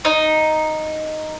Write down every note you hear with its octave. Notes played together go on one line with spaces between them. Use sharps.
D#4